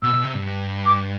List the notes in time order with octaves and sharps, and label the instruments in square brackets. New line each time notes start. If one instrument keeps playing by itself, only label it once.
[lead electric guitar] B2 [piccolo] E6
[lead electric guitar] B2
C3
G2
[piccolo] D6